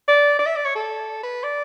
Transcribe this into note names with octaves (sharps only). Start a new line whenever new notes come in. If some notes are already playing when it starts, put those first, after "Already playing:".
D5
D5
E5
D5
C#5
A4
B4
D5